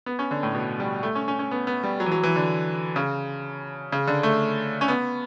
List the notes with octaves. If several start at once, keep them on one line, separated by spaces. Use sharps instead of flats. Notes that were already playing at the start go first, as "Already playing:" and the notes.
B3
C#4
D3
A2
B2
G3
A3
C#4
C#4
C#4
B3
B3
G3
F#3
E3
F#3
E3
D3
C#3
C#3
D3
A3
C#4
B3